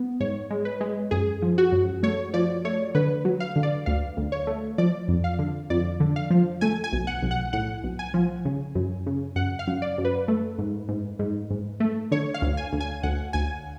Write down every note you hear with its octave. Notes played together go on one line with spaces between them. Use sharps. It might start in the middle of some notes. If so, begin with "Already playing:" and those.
Already playing: B3
G#2 C#5
G#3
B4
G#3
F#2 G#4
F3
F#4
F#2
A3 C#5
F3 D5
A3 C#5
D3 B4
F#3
F5
D3
D5
D2 F5
D2
C#5
A3
F3 D5
F2
F5
D3
F2 D5
D3
F5
F3
A3 G#5
G#5
B1
F#5
B1
F#5
A2 F#5
B1
G#5
F3
C#3
F#2
C#3
F#2 F#5
F5
F#2
D5
F#2
B4
A3
G#2
G#2
G#2
G#2
A3
D3 C#5
F5
D2
G#5
D2
G#5
D2 F#5
D2 G#5